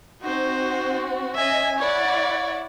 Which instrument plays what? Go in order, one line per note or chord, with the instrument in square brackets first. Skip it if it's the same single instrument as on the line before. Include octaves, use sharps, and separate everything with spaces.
[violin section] C4 F#4 [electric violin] D#4 C5
[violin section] C#4 D#5 G#5 [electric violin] E5
[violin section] E4 D5 F#5 [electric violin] C#5